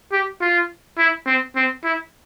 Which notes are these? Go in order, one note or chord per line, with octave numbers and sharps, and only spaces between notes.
G4
F4
E4
C4
C4
E4